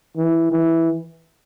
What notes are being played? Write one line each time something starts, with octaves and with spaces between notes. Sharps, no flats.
E3
E3